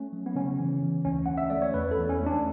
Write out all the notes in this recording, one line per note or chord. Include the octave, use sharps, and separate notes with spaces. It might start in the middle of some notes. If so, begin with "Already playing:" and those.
Already playing: A3 C#4
F#3
B3
C#3 C#4
E3
E3
D2 C#4
D2 F#5
E5
A3 D5
C#5
E2 B4
A4
E2
C#4
A3
D4